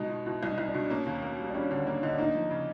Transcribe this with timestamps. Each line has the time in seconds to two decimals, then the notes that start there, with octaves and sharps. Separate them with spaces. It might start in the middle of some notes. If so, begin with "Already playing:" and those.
Already playing: B2 G#3 D#4
0.10 B2
0.26 B2 E4
0.43 C2 D#4
0.58 C2
0.68 D4
0.74 B2
0.90 A#3 C#4
1.06 D#2
1.22 A#3
1.39 G3
1.50 D4
1.54 G3 C#4
1.70 D3 C#4
1.87 A#3 D4
2.03 D3 D#4
2.13 D4
2.18 A#3 D#4
2.35 F3
2.51 C#3